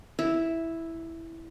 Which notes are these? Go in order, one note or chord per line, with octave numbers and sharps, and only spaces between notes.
E4